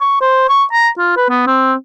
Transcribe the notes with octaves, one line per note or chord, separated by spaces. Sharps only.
C#6
C5
C#6
A#5
F4
B4
B3
C4